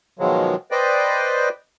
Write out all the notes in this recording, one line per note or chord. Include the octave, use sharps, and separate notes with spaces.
B2 D#3 F3 F#3 G#3
B4 C5 D5 D#5 G5